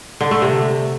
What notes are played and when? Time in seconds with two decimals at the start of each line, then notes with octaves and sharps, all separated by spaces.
0.21 D3
0.31 A3
0.42 C3